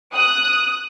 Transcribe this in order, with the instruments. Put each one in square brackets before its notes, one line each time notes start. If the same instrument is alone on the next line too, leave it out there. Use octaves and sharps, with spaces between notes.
[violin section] D#6 F#6